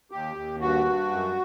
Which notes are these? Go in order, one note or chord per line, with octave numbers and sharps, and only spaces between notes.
D#2 G4
D#2
G2 F#4
G2
F#2